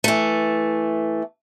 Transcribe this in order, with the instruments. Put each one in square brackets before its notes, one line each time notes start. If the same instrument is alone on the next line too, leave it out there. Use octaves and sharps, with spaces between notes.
[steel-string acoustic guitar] E3 A3